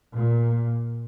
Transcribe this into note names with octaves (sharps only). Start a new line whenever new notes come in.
A#2